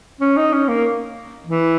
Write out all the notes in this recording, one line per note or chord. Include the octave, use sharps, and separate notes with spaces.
C#4
D#4
C#4
A#3
E3